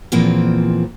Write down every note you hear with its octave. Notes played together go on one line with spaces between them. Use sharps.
E2 A#2 E3 F3 A#3 C4